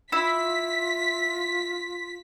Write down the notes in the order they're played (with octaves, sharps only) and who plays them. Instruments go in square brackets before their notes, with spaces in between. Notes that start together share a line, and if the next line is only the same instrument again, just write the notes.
[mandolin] E4 [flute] F4 [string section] B6